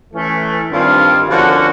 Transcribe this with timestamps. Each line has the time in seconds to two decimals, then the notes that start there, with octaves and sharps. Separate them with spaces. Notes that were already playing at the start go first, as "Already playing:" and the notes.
0.13 E3 A3 C#4
0.71 G2 D#3 G3 C4 F4
1.27 D3 F3 A#3 C#4 F#4